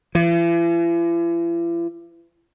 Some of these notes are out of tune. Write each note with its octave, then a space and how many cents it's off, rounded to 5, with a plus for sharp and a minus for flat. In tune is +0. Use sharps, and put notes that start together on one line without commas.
E3 +45